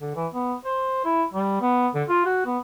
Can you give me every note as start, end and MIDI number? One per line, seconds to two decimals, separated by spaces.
0.01 0.14 50
0.16 0.27 52
0.34 0.55 59
0.65 1.01 72
1.05 1.24 64
1.34 1.57 55
1.61 1.88 59
1.95 2.04 50
2.09 2.25 65
2.26 2.43 66
2.46 2.58 59